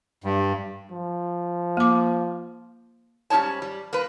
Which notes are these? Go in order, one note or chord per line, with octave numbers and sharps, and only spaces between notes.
G2
F3
A#3 D6
G#2 G3 C#4 D#4 C#5 A5
G3
A#3 B4